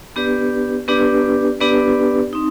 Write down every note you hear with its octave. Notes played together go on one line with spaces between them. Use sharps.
B3 D4 G4 B4 D5
B3 D4 G4 B4 D5
B3 D4 G4 B4 D5
C4 D#4